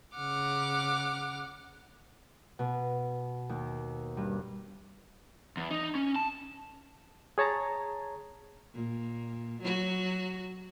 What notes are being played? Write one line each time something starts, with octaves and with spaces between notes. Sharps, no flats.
C#3 F#5 D6 F6
B2
D#2
G2
E2
D#4
C#4
A5
G#4 C#5 A5 A#5
A#2
F#3 F#4